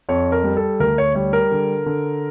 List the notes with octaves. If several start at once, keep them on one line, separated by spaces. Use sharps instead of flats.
F2 C#5
A#4
G3
A4
D2 A#4
C#5
G3 C#5
A#4
D3
D3